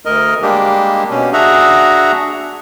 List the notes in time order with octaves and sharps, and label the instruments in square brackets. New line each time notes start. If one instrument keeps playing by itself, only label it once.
[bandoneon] D2 A#4 D#5
G3 G#3 A#3 D4 G4
B2 C#4
D4 F#4 G#4 E5 F#5 A#5